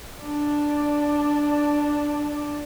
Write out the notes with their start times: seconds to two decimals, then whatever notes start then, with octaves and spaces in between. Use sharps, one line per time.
0.23 D4 D5